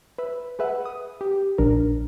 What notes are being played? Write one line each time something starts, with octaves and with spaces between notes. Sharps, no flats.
B4 E5
G#4 B4 E5 F#5
D#6
G4
A#1 D4 A#4